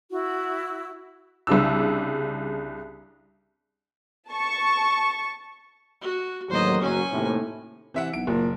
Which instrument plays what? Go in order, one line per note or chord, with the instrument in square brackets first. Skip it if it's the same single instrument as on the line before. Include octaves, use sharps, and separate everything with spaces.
[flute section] E4 F#4
[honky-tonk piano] C2 C#3 D4 E6
[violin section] A5 C#6
[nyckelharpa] F#4
[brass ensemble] A1 D#2 F#3 [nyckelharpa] C5 D#5
[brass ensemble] F#1 F#3 [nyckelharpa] C#4 G#5
[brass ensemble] D#2 A2 C3
[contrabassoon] C3 [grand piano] E3 E5 F#5
[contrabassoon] B1 [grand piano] D7
[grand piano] F#1 [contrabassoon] A#2